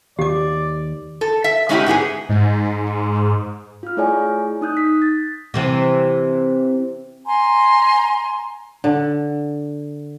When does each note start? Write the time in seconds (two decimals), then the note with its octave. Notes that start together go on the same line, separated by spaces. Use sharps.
0.19 D#2 G4 D5 D6
1.21 A4
1.44 E5
1.69 G#3 C#4 D#4 E4 F#4 G4
1.86 G#2 B3 G4 G#4
2.29 G#2
3.83 F4 F6
3.97 A3 E4 G#4 C#5 D5 G#5
4.61 D#4 D#6 F#6 G6
4.77 B6
5.02 A6
5.54 C3 E3 C4
7.26 G#5 A#5 C6
8.84 D3